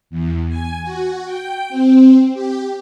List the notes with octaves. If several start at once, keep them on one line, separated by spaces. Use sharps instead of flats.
E2
G#5
F#4
G5
C4
G4